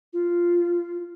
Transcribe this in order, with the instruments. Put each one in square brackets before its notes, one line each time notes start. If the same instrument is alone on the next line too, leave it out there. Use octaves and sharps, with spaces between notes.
[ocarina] F4